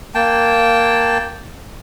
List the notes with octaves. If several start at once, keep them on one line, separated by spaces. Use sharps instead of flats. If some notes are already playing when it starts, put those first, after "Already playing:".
A#3 G5 A5